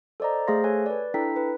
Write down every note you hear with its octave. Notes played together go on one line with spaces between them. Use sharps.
A4 C5 D5 D#5 A#5
A3 G#4 C5 F5 C6 A#6
A4 C#5 G#5 F#6
B4 D5
D4 E4 A4 G5 A#5 B6
B4